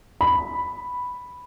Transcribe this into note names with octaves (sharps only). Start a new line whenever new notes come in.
B5